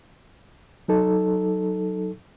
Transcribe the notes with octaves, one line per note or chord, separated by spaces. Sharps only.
F#3 D#4 A4